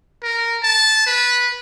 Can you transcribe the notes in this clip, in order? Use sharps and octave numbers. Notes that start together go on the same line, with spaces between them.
A#4
A5
B4